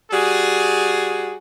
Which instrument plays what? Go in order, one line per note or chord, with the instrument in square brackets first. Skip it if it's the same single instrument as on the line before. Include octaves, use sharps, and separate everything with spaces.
[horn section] G3 F#4 G#4